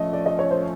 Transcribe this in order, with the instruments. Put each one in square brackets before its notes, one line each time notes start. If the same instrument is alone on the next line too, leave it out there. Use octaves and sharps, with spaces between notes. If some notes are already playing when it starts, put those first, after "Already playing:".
Already playing: [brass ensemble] F3 A3 C#4 [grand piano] D#5
[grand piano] D5
D#5
C#5
C5